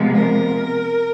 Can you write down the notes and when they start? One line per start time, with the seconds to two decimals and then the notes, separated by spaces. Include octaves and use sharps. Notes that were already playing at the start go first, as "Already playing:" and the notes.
Already playing: C3 F3 G#3 B3
0.15 A#4